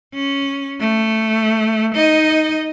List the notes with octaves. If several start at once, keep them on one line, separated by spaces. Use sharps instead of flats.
C#4
A3
D#4 D#5